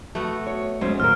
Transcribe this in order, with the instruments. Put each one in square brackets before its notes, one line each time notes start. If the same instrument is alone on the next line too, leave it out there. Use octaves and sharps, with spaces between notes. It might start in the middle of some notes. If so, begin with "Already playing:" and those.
[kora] A3 B3 F#4
[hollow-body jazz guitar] C#5
[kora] F#3 [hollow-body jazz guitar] G#3 C#4 C5
[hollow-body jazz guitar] D#2 A#2 A#4 [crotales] F6